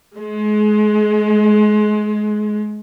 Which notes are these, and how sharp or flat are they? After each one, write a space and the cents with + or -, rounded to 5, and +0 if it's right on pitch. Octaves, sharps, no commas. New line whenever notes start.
G#3 +30